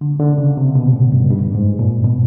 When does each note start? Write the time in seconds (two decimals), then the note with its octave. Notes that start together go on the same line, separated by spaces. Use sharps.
0.01 D3
0.20 D3
0.38 C#3
0.57 C3
0.75 B2
0.93 A2
1.12 G2
1.30 G2
1.55 G#2
1.79 A#2
2.04 B2